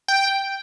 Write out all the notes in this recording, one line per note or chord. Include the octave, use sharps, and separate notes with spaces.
G5